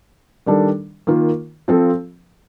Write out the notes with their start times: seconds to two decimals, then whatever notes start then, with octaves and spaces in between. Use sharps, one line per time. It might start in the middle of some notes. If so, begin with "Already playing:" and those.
0.46 D#3 G3 D4 A4
1.07 D#3 A#3 F4
1.68 F3 C4 F4 A4